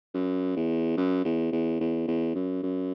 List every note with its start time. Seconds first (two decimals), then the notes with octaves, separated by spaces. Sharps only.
0.14 F#2
0.56 E2
0.97 F#2
1.25 E2
1.52 E2
1.80 E2
2.08 E2
2.35 F#2
2.63 F#2